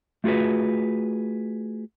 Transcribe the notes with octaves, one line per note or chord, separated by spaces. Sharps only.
A3 F4 F#4 G#4 B4